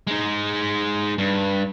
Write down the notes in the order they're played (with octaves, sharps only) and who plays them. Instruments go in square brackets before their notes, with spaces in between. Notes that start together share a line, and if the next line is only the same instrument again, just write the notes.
[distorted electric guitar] G#3 D#4
G2